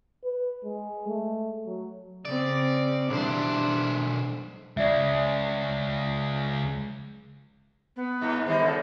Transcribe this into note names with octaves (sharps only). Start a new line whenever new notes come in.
B4
G#3
A3
F#3
C#3 C4 D5
B1 E3 G3 D4 C5
C#2 G#3 D5 E5
B3
G2
D#3 G3 D#4 C5
C#3 A4